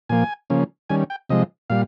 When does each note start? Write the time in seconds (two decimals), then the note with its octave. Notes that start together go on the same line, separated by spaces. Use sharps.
0.09 A#2 F3 A#3 G#5
0.50 C#3 F3 A#3 C#4
0.90 D#3 G3 C#4 G#5
1.10 G5
1.30 C3 F3 G#3 D#5
1.70 A#2 G3 F5